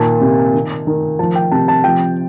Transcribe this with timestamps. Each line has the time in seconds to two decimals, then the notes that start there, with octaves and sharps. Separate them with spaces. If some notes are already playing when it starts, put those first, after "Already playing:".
Already playing: A#2 D#3 A5
0.21 C3
0.54 D#3
0.87 D#3
1.19 F3 A5
1.36 G5
1.52 C3 A5
1.68 A5
1.84 F3 G5